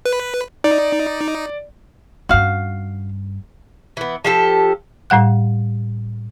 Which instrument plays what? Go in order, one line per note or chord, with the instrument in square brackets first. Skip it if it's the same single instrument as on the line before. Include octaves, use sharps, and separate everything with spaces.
[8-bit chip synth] B4
[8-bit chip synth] D#4 [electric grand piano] D5
[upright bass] G2 C#4 [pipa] F#4 F5
[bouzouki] E3 B3
F3 G4 A4
[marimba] A2 G3 F#5 F#6